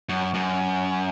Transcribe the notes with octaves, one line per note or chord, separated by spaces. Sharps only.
F#2
F#2